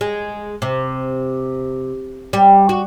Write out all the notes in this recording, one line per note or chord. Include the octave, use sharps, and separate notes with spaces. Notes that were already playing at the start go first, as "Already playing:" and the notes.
G#3
C3
G3
F#4